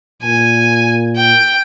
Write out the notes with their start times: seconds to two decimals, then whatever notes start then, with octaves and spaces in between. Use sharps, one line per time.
0.23 A#2 G#5
1.16 G5